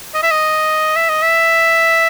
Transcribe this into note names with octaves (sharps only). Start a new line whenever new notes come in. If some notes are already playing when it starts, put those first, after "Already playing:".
D#5
E5
D#5
E5
D#5
E5